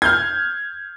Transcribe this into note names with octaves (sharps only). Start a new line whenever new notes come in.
F6 G6 G#6